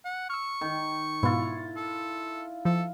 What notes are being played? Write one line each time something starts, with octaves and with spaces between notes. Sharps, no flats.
F#5
C#6 E6 F6
D#3
G#2 B2 B3 E4 F4
A4
F3 A4